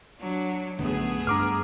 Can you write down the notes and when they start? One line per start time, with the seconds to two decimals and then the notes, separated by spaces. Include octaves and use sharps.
0.19 F#3 D4
0.79 B1 F#2 D3 A3 B3 G#4
1.27 G2 D4 A#5 D6 F6